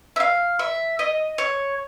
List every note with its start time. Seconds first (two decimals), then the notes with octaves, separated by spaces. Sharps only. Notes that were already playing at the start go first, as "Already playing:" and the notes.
0.16 E5
0.20 F5
0.59 E5
0.99 D#5
1.38 C#5